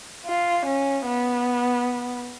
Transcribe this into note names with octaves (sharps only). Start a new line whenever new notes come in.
F4
C#4
B3